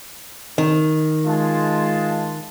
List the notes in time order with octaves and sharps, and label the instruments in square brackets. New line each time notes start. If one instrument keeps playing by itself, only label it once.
[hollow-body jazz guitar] D#3
[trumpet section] G#3 F4 A5